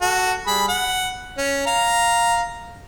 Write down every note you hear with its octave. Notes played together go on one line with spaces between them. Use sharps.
F#4 A4
G3 G#4 B5
F#5
C#4
F5 A#5